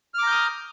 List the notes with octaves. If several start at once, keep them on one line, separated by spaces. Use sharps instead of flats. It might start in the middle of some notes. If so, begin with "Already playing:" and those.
A#5 D6 D#6 F6 G6